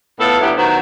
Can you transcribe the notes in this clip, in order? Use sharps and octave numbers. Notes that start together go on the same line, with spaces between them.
A2 B3 F4 A4
A2 F#3 B3 D4 E4 G4
D#3 F#3 B3 F#4 C5